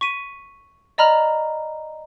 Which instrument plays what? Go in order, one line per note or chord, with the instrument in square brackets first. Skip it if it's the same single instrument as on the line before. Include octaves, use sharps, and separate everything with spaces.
[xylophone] C#6 B6 D#7
D5 D#5 A#5 B5 F6 F7